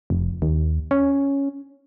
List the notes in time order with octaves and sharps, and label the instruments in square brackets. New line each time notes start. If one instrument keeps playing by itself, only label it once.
[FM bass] F1
D#2
C#4